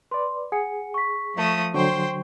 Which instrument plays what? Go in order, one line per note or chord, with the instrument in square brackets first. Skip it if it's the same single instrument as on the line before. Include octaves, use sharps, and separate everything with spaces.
[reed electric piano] B4 D5 [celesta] C6
[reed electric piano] G#4 [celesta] F#5 G#5 C#7
[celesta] C#6 B6
[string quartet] F3 A3 D#6
[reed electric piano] D3 F#3 [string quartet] C5 G5 C6 [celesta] C#6